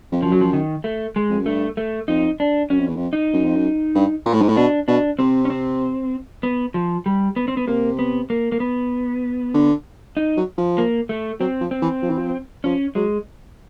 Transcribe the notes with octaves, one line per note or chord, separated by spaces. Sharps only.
F2
F#2 F3
F#3
F3
D#3
A3
G#3
F2
F#2
G2 A3
A3
F2 D#4
D4
F#2 C#4
F2
E2
F2
D#4
F#2
F2
F#2
G2
A#2
A2
G#2
A2
B2 D4
B2 D4
C3 C4
C#4
C4
B3
F3
G3
B3
C4
B3
C3 A#3
B3
A#3
A#3
B3
D3
D#4
F#3
F3
A#3
A3
F#3 C4
F3
C4
E3
F3
E3
F3
F3 C#4
F#3 G#3